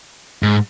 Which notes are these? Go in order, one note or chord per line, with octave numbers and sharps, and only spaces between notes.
G#2